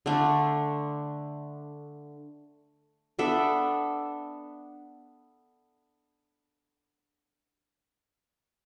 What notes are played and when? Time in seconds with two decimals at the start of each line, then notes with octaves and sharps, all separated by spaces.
0.06 D3 A3 D4
3.19 B3 D4 A4 E5